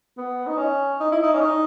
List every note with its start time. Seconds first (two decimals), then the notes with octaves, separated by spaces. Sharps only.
0.17 B3
0.47 D#4
0.58 C#4
1.00 D#4
1.12 E4
1.23 D#4
1.34 C#4
1.41 D#4